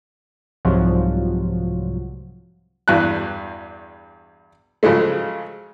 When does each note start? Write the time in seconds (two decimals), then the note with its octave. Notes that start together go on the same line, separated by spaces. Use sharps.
0.65 C2 G#2 F3 F#3
2.88 E2 G2 F#4 F#6
4.83 C#3 F3 F#3 G#3 A3